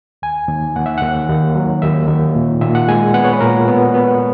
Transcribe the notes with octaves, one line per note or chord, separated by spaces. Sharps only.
D#2 G#5
D#2
D#2 F#5
E5
D#2 F#5
D#2
F#3
D#2 E5
D#2
A#2
A#2 E5
F#5
G#3 G#5
B3 F#5
C#5
B4
A#2 A#4
B3
B3